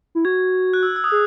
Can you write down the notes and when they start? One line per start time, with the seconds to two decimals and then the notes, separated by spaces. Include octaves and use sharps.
0.15 E4
0.25 F#4 G#6
0.74 F#6
0.83 E6
0.96 E6
1.04 D#6
1.12 G#4